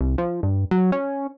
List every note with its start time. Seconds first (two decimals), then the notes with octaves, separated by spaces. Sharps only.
0.01 C2
0.18 F3
0.43 G2
0.71 F#3
0.92 C#4